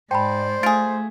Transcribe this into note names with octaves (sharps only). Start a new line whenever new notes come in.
G#2 C5 D5 G5 A5 B5
A3 F4 G#4 A6 D7